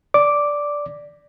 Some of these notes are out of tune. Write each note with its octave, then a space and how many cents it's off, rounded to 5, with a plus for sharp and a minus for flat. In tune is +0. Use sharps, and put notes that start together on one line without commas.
D5 -5 D6 +0